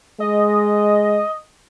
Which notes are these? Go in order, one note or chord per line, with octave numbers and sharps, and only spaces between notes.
G#3 D#5